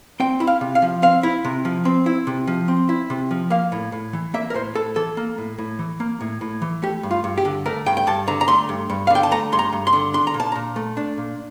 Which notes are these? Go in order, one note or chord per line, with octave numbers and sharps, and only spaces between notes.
C4 G5
E4
F5
C3
F5
F3
C4 F5
E4
C3
F3
C4
E4
C3
F3
C4
E4
C3
F3
A#3 F5
A2
A2
E3
A#3 E5
A#4
A2 C5
A2 A4
E3 A4
A#3
A2
A2
E3
A#3
A2
A2
E3
A3 G4
G2
F4
G2
G4
D3
A3 A#4
G2 G5
G5
G2 A5
D3 A#5
A#5
A3 C6
G2
G2
F5
D3 G5
A5
A3 A#5
G2 C6
A#5
G2
C6
D3
D4 C6
A#5
A#2
A5
A#2 A#5
A3
D4
A#2